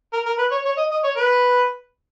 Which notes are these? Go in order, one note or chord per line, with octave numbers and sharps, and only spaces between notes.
A#4
A#4
B4
C#5
C#5
D#5
D#5
C#5
B4